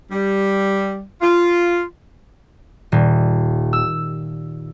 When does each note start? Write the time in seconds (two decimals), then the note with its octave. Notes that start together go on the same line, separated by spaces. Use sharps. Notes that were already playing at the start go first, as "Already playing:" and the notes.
0.11 G3
1.21 F4
2.92 D#1
3.73 E6